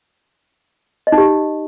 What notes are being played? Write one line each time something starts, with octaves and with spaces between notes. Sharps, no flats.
D#5
D#4
G4